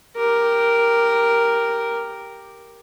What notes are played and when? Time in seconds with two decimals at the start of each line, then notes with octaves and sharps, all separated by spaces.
0.16 G4 A#4